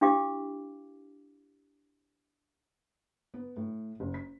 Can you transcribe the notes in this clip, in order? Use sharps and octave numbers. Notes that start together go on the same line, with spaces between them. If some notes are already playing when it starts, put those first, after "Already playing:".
D4 E4 G4 F5 D6
B3
A2
F#1
B6